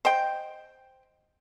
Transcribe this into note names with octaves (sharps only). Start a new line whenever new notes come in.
C5 D#5 G5